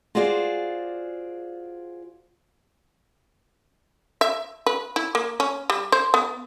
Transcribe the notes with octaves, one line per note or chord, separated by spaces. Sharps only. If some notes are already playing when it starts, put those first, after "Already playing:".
F4 F#4 G#4 C5 D5 F5
E5
B4
E4
A#3
C#4
G3
C5
B3